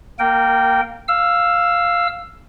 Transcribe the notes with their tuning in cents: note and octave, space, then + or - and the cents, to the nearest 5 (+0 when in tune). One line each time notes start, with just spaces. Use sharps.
A#3 +0 A#4 -25 G5 -15
F5 +0 E6 +10